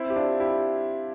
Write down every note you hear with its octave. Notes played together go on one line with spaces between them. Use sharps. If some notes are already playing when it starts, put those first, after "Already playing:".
Already playing: C4 E4
G4
D4 F4
E4 G4